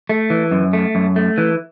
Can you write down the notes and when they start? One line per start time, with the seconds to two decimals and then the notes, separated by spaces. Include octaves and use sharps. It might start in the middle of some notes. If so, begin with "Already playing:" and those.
0.09 A3
0.30 E3
0.51 F#2
0.73 A3
0.95 F#2
1.16 A3
1.38 E3